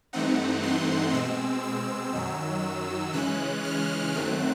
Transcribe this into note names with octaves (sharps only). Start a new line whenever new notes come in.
G2 E3 A3 C4 D#4 F#5
C6
B2 G#3 C4 E6
E6
F#2 D#3 F#3
C#3 E3 G#3 C#4 F#6
F6
F#2 D#3 F#3 A3 C4 F#6